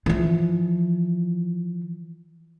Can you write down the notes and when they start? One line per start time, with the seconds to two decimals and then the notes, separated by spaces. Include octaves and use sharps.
0.06 E3 F3